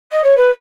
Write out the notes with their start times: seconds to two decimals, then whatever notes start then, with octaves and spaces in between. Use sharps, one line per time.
0.12 D#5
0.24 C#5
0.37 B4